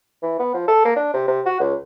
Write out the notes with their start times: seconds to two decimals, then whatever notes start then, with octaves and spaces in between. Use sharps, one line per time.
0.23 E3
0.39 B3
0.54 F3
0.68 A4
0.85 A#3
0.96 D4
1.14 C3
1.28 C3
1.46 F#4
1.60 C#2